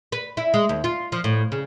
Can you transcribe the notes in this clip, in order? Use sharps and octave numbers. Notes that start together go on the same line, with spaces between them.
B4
E4
G#3
D#2
F4
F3
A2
C#3